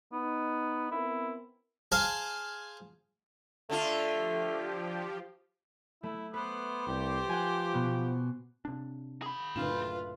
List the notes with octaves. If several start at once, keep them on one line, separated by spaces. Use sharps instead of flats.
B3 D#4
B3 C4 E4 A#4
G#4 C5 F5 G#5 A5
D3 A3 D4 F4 B6
F3 G4
A3 E4
A3 B3 B4 C5 D6
C2 G4
F3 F#5 G#5
B2 B3
C3 D4
G#4 B5
F#1 D2 A2 F4 B4 E7